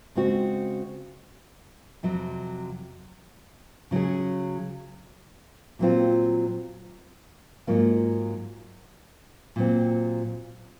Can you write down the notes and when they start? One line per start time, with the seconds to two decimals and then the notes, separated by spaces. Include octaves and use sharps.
0.15 C#3 G#3 C4 F#4
2.03 F2 C3 F#3
3.91 C#3 F#3 C#4 G#4
5.79 A#2 F#3 C4 F4
7.67 G#2 F#3 A#3 F4
9.56 A#2 F#3 C4